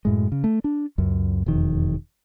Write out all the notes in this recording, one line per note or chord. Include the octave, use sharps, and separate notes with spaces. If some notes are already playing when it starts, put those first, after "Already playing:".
F#2 A2 G#3
C#3
A3
D4
C#2 F#2
E1 F2 D#3